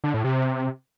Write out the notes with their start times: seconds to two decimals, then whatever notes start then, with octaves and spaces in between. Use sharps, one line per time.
0.04 D3
0.14 A2
0.24 C3